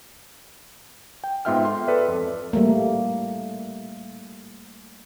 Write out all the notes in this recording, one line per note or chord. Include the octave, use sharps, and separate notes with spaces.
G5
G#2 B3 F4 E5 G5 F6
A4 C6
A4 B4 D5 E5
F2
G3 A3 A#3